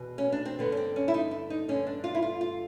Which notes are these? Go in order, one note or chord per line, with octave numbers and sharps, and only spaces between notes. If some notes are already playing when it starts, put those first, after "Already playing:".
Already playing: E2 B2
C#4
D4
C4
G2 D3 B3
C#4
C4
C#4
E4
D#4
E4
D#4
G2 D3 C#4
D4
F4
E4
F4
F4